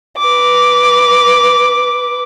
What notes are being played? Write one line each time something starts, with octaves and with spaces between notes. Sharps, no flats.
B4 D6